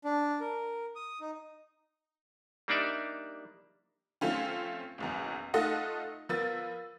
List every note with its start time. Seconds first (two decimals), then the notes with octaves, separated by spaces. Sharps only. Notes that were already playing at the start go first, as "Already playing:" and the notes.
0.05 D4
0.40 A#4
0.96 D#6
1.21 D#4
2.68 G3 A#3 D4 D#4 D5 E5
4.21 F3 A3 C4 C#4 F4
4.98 F#1 B1 E2
5.54 A3 D#4 F4 A4 D#5 F#5
6.29 F3 B3 A#4 E6 A6